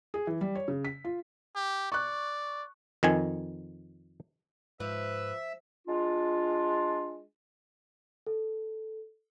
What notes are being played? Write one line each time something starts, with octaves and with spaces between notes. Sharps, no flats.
G#4
E3
G3
C#5
C#3
B6
F4
G4
D5 C#6 F#6
F2 D#3 G#5
G#2 F3 B4 E5
G#3 D4 F4
A4